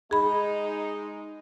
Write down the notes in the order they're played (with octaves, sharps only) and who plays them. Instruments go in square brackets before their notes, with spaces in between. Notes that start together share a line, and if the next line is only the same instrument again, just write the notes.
[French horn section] G#3 D#4 [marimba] G#4 B5